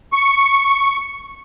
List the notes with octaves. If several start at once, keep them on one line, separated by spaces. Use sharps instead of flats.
C#6